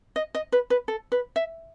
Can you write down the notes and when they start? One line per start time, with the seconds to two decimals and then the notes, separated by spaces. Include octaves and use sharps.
0.16 D#5
0.35 D#5
0.52 B4
0.70 B4
0.88 A4
1.12 B4
1.36 E5